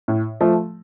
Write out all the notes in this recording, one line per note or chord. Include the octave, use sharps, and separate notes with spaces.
A2
F3 A3